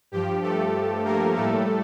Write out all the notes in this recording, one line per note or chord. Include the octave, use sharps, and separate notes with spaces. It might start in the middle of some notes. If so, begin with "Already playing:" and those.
G2 F3 G4
A3 A4
A#3 A#4
A2 G3 A3 A4